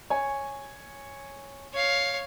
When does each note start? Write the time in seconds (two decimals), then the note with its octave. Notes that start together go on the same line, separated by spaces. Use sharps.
0.10 C#5 G#5
1.72 C#5 F5